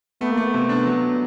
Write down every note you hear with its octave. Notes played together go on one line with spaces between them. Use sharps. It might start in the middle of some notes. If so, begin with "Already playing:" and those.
A3 B3
A#3
A3
B3
C3
D4
F#3